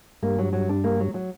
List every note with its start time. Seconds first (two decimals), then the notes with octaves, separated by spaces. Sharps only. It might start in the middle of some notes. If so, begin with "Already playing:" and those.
0.23 G2 A#3
0.39 F#3
0.53 F#3
0.69 D4
0.84 A#3
1.00 F#3
1.14 F#3